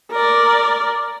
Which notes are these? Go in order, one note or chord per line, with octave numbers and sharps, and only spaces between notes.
A#4 D5